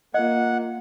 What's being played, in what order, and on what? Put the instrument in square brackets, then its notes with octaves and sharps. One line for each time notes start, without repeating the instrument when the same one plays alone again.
[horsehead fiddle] A#3 F4 [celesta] D#5 [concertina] F#5